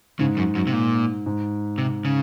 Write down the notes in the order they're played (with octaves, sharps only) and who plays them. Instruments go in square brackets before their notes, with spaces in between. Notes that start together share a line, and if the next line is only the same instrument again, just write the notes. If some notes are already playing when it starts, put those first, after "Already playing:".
[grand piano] G#2 [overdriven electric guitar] C#3
[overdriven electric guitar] F#2
F#2
C3
A#2
[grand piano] G#2
[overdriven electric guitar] C3
C#3